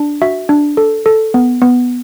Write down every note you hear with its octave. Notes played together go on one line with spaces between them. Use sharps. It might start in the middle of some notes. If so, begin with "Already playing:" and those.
Already playing: D4
F#4 E5
D4
A4
A4
B3
B3